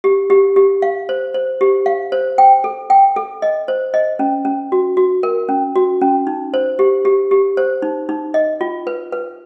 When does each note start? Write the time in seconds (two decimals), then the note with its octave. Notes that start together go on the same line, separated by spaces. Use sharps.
0.04 G4
0.30 G4
0.56 G4
0.82 F5
1.09 C5
1.34 C5
1.61 G4
1.86 F5
2.12 C5
2.38 G5
2.64 A4
2.90 G5
3.16 A4
3.42 D#5
3.68 C5
3.94 D#5
4.19 C#4
4.45 C#4
4.72 F#4
4.97 F#4
5.23 A#4
5.49 C#4
5.76 F#4
6.01 C#4
6.27 D#4
6.54 C5
6.79 G4
7.05 G4
7.31 G4
7.57 C5
7.82 D#4
8.09 D#4
8.34 D#5
8.61 F4
8.87 B4
9.12 B4